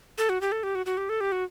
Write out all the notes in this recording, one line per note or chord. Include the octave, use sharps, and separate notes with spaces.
A4
F#4
G4
A4
G4
F#4
F#4
G4
A4
G4
F#4